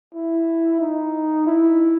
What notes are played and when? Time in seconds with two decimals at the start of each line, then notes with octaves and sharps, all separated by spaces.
0.14 E4
0.81 D#4
1.46 E4